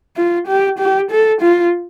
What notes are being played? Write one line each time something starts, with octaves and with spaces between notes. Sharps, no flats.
F4
G4
G4
A4
F4